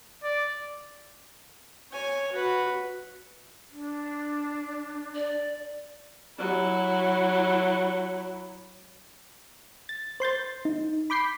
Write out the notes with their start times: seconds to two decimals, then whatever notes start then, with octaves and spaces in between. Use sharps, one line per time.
0.24 D5
1.91 C#5 G#5
2.31 F#4 B4
3.71 D4
5.15 D5
6.39 F#3 E4
9.89 A6
10.20 C5 C6 G6 A6
10.65 D#4
11.10 B5 D6 G6 B6 C7